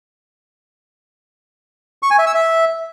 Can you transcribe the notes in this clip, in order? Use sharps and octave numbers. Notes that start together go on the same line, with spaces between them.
C#6
G#5
E5
E6
E5